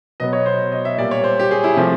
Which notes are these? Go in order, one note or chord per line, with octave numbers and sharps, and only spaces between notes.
B2 F#3 B3 D#5
C#5
C5
D#5
E5
A#2 G3 A#3 D5
C#5
C5
G4
G#4
E4
C3 F3 A3